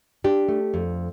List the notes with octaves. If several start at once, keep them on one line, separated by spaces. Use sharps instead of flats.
D4 G4
A3
F2